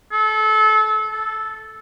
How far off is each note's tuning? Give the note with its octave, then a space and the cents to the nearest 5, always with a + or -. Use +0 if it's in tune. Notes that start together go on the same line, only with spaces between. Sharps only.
A4 -30
A4 -10